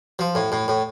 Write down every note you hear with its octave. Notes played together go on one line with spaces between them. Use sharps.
F3
A2
A2
A2